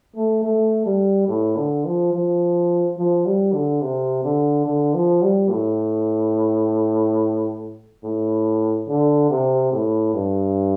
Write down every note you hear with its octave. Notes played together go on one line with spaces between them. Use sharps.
A3
A3
G3
A2
D3
F3
F3
F3
G3
D3
C3
D3
D3
F3
G3
A2
A2
D3
C3
A2
G2